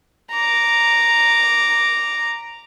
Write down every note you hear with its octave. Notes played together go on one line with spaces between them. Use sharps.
A#5 D6